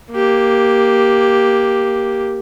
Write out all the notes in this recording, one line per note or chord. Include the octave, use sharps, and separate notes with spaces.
A#3 G4